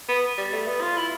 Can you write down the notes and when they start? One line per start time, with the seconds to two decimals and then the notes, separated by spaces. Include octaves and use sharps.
0.08 B3
0.37 G3
0.52 A3
0.67 B3
0.81 F4
0.96 E4